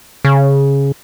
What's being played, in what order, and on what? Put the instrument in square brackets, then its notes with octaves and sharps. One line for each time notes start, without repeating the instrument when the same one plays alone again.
[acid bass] C#3